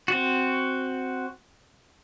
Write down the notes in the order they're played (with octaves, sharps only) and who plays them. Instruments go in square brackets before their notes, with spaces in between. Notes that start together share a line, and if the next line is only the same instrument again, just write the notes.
[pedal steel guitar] C4 F#4